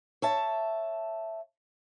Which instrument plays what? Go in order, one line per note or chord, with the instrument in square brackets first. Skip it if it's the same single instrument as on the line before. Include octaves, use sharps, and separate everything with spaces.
[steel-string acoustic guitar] C#5 E5 A5